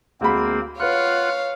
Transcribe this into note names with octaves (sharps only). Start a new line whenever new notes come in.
D2 G#3 A#3 C4 B5
F4 B4 C#5 F5 F#5 F6 F#6